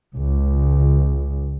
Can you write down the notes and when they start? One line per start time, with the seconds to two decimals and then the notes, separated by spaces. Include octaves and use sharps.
0.16 C#2